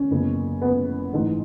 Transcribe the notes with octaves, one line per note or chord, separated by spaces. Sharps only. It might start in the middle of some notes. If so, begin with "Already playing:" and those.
Already playing: C#4
F#1 E2 C#3
B3
A1 G#2 E3